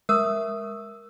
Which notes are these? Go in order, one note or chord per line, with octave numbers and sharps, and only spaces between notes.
G#3 A#4 E5 D#6